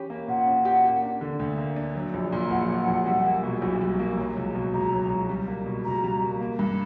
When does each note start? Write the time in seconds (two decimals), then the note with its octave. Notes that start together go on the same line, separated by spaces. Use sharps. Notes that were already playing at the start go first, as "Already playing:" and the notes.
Already playing: E3 C#4 G4
0.10 A#3
0.28 A#2 F#5
0.46 C#4
0.65 G4
0.84 A#3
1.02 D4
1.21 D3
1.39 D2
1.58 A#3
1.76 D4
1.95 F#3
2.14 A#1
2.32 A#2
2.51 A#1 F#5
2.69 F#3
2.87 A#1
3.06 G3
3.25 A#3
3.43 B2
3.62 B1
3.81 G3
3.99 A#3
4.18 F#3
4.36 C#2
4.55 B2
4.74 C#2 A#5
4.92 F#3
5.10 C#2
5.29 G3
5.48 A#3
5.66 B2
5.84 C#2 A#5
6.04 G3
6.22 A#3
6.41 A#3
6.59 G2